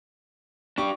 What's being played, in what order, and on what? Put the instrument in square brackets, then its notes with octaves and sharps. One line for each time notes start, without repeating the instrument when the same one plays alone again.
[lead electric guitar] D4 G4 [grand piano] C#6